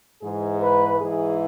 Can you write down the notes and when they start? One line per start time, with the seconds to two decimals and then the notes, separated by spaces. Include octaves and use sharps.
0.22 G#2 E3 G#4
0.61 B4
1.00 G#2 E3 G#4